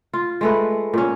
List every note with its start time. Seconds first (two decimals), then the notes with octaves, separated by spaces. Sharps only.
0.14 F4
0.41 G#3 A3 B4
0.94 A#2 C#4